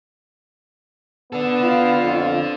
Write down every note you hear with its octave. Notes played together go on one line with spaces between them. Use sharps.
B3 D4 A4
F4
F2